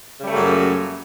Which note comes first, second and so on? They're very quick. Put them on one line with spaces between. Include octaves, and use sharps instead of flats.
C#3 G3 A3 A#3 F#2